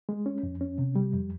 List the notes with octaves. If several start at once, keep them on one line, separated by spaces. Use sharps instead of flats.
G#3
C#4
F2
C#4
C3
G3
F2